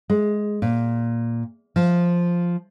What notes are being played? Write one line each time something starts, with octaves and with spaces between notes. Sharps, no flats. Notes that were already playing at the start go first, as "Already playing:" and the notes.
G#3
A#2
F3